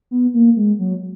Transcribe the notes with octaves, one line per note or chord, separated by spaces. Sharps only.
B3
A#3
G#3
F#3